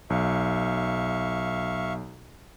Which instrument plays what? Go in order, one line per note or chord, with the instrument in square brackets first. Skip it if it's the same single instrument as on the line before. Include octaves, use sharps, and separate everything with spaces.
[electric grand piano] B1 [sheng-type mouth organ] E5 F5 C#6